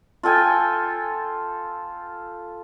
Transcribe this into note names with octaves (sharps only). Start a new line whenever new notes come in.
F4 A4 G5 G#5